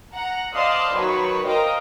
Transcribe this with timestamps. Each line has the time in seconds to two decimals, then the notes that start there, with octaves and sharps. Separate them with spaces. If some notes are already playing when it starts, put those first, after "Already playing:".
0.13 F#5 A#5
0.54 C5 D5 D#5 F5 A5 C6
0.94 D#3 F#3 D#4 B4 C#5
1.47 A#4 C5 D#5 F5 G5 A#5